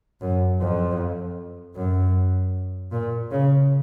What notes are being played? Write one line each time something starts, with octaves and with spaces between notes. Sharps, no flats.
F#2
F2
F#2
A#2
C#3